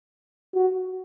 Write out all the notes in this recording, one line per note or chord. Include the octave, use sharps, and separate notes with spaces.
F#4